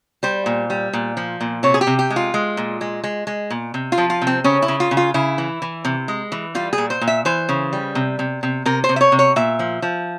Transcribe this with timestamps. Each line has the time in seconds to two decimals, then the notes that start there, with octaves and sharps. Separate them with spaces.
0.23 G3 C5
0.46 A#2
0.70 G3
0.93 A#2
1.17 F3
1.41 A#2
1.63 C3 C#5
1.74 G#4
1.81 G4
1.87 C3
1.99 G4
2.10 G#3
2.16 F4
2.34 G#3
2.57 A#2
2.81 G#3
3.04 G#3
3.27 G#3
3.50 A#2
3.74 C3
3.92 F4
3.98 F3
4.10 F4
4.22 C3
4.27 C4
4.44 C#3 C#4
4.62 E4
4.68 C#3
4.80 F4
4.91 C#3
4.97 F4
5.14 C#3 E4
5.38 E3
5.62 E3
5.85 C3
6.08 G#3
6.32 E3
6.55 G3 F4
6.73 G#4
6.78 A#2
6.90 C5
7.01 A#2
7.08 E5
7.25 E3 C5
7.49 C#3
7.73 G3
7.95 C3
8.19 C3
8.43 C3
8.66 C3 A#4
8.84 C5
8.89 C3
8.96 E5
9.01 C#5
9.12 C3
9.19 C#5
9.36 A#2 E5
9.59 F3
9.82 F3